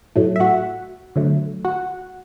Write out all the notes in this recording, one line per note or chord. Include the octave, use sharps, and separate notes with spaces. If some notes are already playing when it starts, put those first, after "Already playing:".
A2 F#3 A3
E5
F#4 F#5
D3 F#3 A3
F#4 F#5